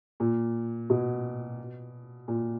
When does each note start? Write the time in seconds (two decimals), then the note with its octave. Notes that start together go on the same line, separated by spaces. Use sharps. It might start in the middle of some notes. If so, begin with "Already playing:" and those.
0.20 A#2
0.90 B2
2.28 A#2